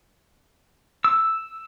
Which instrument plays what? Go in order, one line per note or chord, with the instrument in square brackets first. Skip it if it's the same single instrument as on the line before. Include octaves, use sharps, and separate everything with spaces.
[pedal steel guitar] E6